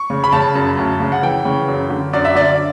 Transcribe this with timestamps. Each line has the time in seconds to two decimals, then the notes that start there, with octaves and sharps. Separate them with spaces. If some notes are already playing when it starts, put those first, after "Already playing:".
Already playing: C#6
0.10 C#3
0.24 B5
0.32 C#3 A5
0.55 F#2
0.77 D2
1.00 C#3
1.12 F#5
1.22 E3 G5
1.45 C#3
1.68 F#2
1.90 D3
2.13 F#2 D5
2.25 E5
2.35 D3 D5